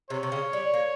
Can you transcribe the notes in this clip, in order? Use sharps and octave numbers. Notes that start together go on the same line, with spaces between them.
C3 C#5
C3
C#3
G3
A#3